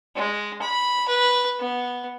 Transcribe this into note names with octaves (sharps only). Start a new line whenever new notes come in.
G#3
B5
B4
B3